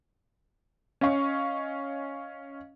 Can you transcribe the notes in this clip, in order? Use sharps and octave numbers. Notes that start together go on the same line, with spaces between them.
C#4 D#5 F5 C#6